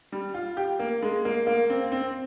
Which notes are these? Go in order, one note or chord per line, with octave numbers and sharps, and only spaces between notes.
G3
F4
G4
A#3
G#3
A#3
A#3
C4
C4